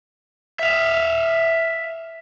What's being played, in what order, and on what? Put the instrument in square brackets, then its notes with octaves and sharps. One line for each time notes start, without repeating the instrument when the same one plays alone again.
[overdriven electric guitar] E5 F5